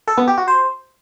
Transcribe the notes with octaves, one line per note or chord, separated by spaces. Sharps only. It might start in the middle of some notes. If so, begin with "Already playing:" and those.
A4
B3
G4
F#4
C5